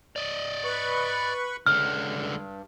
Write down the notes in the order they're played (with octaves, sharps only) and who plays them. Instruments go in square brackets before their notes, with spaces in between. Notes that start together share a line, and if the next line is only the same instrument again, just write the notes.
[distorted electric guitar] D5 D#5
[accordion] B4 B5 C#6
[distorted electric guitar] C#2 D3 [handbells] F6
[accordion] G2